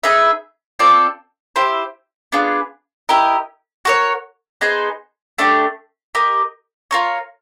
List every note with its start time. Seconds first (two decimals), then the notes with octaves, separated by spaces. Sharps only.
0.03 D#4 G#4 B4 E5
0.79 C4 F4 A4 D5
1.56 E4 G4 C5
2.32 B3 D4 F4 G#4
3.09 E4 G4 A#4 D#5
3.85 F#4 A#4 C#5
4.61 B3 D#4 G#4 C5
5.38 A3 D4 G4
6.15 G4 A#4 D#5
6.91 F4 A#4 C#5